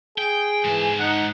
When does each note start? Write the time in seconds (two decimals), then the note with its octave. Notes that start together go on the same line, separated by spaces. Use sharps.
0.18 G#4 G5
0.64 G#2 E3 A5
0.99 D#4 F#5